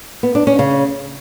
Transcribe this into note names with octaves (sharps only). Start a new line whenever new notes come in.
B3
D4
C#4
C#3